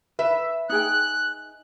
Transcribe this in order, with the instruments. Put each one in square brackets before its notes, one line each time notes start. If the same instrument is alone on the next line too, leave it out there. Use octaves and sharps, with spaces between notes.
[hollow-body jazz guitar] B4 [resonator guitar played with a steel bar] E5
[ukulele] D#4 G#4 G5 [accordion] F#6